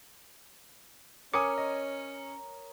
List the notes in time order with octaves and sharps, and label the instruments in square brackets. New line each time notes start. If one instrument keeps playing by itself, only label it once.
[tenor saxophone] C#4 [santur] A#4 C#5 [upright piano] G#5 D#6 C#7 [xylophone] D6
[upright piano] D#5